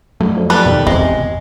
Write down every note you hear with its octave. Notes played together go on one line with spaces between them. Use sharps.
F#3 A3
F2
G3 A4 B4
D#2 B2
G#1 E2 C3 G#3 B3